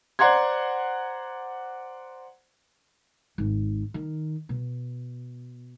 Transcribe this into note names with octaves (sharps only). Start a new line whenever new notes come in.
C5 D5 F#5 A#5 C6 G#6
G#1
D#3
B2